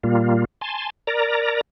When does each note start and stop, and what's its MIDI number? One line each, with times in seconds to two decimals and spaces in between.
0.04 0.45 46
0.04 0.45 55
0.04 0.45 58
0.04 0.45 65
0.61 0.90 80
0.61 0.90 81
0.61 0.90 84
1.07 1.61 70
1.07 1.61 74
1.07 1.61 82